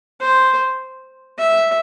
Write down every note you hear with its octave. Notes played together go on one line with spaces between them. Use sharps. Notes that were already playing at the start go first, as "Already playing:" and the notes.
C5
E5